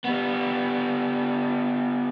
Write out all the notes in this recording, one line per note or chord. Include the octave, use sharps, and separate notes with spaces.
G3 B3